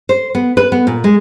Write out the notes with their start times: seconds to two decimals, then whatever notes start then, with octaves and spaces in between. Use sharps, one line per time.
0.09 C5
0.35 B3
0.57 B4
0.72 B3
0.87 A#2
1.04 G#3